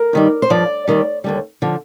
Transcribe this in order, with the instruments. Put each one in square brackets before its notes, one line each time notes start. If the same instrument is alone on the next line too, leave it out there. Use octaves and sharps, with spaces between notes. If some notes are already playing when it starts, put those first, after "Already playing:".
Already playing: [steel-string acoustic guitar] A#4
G2 D#3 G3
C5
G2 F3 D5
D#2 D#3 G3
D#2 D3 G3
D3 F3